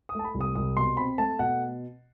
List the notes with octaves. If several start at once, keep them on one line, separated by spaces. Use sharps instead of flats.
D#6
A3 A5
B5
C2
D#6
C2 D#6
B2 C6
C4 B5
A3 A5
B2 F#5